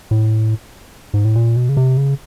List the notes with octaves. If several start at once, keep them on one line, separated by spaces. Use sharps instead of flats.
A2
G#2
A2
A#2
B2
C#3
C3
C#3